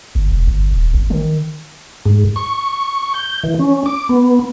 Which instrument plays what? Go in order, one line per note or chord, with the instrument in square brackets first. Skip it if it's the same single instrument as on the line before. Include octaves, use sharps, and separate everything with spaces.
[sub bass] G1
E1
G1
D#1
G#1
D#3
[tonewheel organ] G#2
C#6
G6
E3
C#4
D6
B3